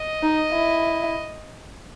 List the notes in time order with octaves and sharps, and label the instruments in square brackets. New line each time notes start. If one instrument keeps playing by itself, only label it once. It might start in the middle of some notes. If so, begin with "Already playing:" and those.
Already playing: [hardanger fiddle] D#5
[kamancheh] D#4
E4